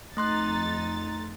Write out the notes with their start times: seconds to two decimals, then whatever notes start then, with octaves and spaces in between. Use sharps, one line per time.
0.17 F2 A3 D#4 C6 F#6 A6